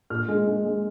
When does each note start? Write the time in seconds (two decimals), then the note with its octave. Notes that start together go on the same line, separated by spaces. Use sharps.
0.10 A#2 F6
0.28 G#3
0.47 G#3
0.65 G#3